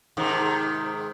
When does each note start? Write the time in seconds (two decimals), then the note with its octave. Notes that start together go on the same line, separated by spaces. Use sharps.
0.17 G#2 C3 D#3